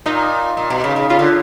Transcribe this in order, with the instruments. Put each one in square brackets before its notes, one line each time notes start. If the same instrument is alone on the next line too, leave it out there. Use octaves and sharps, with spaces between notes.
[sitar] A#2 [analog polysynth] D#4
[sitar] A#2
B2
C#3
C#3
[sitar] C#3 [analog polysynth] F4
[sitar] D3